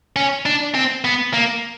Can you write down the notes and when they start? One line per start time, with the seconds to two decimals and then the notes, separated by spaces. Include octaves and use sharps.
0.16 C#4
0.46 D4
0.75 C4
1.04 B3
1.34 A#3